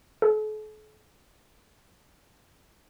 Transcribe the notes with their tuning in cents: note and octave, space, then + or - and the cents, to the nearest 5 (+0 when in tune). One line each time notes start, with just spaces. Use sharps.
A4 -45